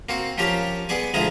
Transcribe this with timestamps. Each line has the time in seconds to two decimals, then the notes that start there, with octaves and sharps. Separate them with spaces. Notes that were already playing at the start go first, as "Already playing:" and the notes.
0.09 A#3 C4 F#4
0.38 F3 C#4 G4 A#4
0.89 B3 G#4 D5 G#5
1.14 D2 F3 G#3 E4 D#5 A#5